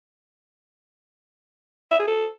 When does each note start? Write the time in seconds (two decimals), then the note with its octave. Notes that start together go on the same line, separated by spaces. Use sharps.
1.92 E5
2.00 G#4
2.07 A4